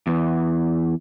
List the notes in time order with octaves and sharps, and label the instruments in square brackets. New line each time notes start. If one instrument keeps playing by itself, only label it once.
[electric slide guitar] E2 E3